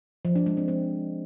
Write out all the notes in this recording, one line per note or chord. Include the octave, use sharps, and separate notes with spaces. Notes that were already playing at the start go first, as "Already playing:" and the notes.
F3
D4
G#3
C4
C4